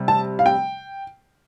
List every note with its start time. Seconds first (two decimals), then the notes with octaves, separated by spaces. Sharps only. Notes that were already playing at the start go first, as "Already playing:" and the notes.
Already playing: C3 G3
0.08 A5
0.39 F5
0.46 G5